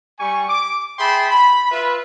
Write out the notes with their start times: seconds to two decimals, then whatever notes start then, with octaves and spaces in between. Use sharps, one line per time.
0.19 G3 G#5 C#6
0.49 D6
0.99 G#4 E5 G5 A5 B5 C6
1.31 B5
1.72 F4 B4 E5